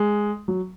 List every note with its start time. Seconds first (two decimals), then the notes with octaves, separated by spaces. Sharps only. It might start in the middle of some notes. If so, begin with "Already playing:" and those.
Already playing: G#3
0.48 F#3